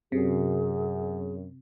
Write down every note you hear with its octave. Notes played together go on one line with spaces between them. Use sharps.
F#2 C3 G#4